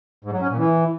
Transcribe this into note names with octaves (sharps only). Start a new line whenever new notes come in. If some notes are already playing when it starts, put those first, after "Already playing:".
G#2
F#3
C#4
A#2
E3